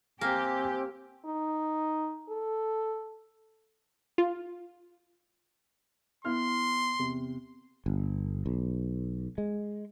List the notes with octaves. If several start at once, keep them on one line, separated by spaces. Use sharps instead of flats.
A#3 C4 G4 G#5
D#4
A4
F4
B3 E4 C6 F6
E2 C3
G1
B1
G#3